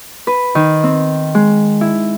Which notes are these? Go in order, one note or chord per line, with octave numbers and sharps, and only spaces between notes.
B4
D#3
C4
G#3
E4